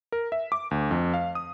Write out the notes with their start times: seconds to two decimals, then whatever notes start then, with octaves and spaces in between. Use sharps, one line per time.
0.12 A#4
0.32 E5
0.52 D6
0.71 D2
0.91 F2
1.14 F5
1.35 D#6